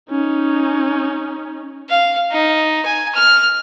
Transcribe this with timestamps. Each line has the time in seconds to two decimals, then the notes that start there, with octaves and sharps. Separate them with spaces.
0.10 C#4 D#4
1.89 F5
2.32 D#4
2.86 G#5
3.15 F6